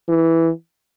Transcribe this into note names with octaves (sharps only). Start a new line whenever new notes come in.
E3